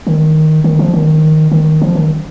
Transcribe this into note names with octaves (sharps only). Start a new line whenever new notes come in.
D#3
D#3
F3
D#3
D#3
F3
D#3